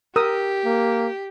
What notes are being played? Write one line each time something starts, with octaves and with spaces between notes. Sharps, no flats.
G4 A#4 D#6 E6
A#3